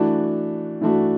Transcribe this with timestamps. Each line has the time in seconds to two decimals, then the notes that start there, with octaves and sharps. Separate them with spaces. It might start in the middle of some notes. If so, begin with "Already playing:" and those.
Already playing: E3 A3 D4 F#4
0.81 E3 A3 D4 F#4